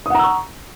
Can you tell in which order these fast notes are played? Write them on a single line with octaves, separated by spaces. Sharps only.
D#6 F#5 A#5 E6 C#6